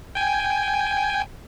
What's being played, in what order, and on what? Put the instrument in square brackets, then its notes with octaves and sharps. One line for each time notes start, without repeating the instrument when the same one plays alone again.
[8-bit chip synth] G5 G#5